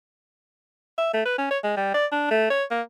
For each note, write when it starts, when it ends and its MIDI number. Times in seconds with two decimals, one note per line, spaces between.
0.98 1.13 76
1.14 1.23 57
1.25 1.35 71
1.38 1.48 61
1.51 1.58 73
1.63 1.75 56
1.77 1.91 55
1.94 2.06 74
2.12 2.26 62
2.31 2.49 57
2.50 2.64 73
2.71 2.82 58